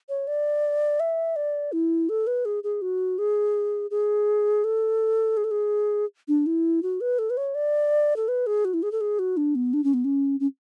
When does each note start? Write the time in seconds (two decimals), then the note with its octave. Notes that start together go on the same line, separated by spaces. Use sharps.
0.09 C#5
0.27 D5
1.00 E5
1.36 D5
1.72 E4
2.09 A4
2.27 B4
2.45 G#4
2.64 G#4
2.82 F#4
3.19 G#4
3.91 G#4
4.64 A4
5.37 G#4
5.44 A4
5.51 G#4
6.28 D4
6.46 E4
6.83 F#4
7.01 B4
7.19 A4
7.30 B4
7.37 C#5
7.55 D5
8.16 A4
8.28 B4
8.47 G#4
8.65 F#4
8.74 E4
8.83 G#4
8.92 A4
9.01 G#4
9.19 F#4
9.37 D4
9.55 B3
9.74 D4
9.84 C#4
9.94 B3
10.05 C#4
10.40 C#4